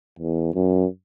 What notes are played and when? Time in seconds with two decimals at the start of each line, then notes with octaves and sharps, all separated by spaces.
0.19 E2
0.54 F#2